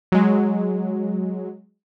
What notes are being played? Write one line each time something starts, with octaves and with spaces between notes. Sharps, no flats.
F#3 G#3